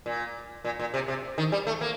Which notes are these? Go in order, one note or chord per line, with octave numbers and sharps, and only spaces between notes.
A#2
A#2
A#2
C3
C3
D#3
G3
A3
A#3